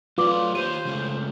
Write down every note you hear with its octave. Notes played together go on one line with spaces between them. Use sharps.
F#3 A3 F4 B4 D5 D6
D#3 G4 C5 C#5 D#7
C#3 G#3 A3